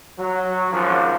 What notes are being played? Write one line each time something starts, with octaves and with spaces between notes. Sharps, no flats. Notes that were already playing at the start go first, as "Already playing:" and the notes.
F#3
G#1 F#2 F3